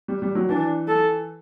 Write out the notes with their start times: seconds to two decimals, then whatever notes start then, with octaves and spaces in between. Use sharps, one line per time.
0.08 G3
0.22 G3
0.35 F#3
0.49 E3 D4
0.88 A4